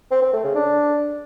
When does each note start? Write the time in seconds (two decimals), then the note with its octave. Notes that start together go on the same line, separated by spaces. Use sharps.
0.11 C4
0.22 C4
0.33 A3
0.44 C#3
0.55 D4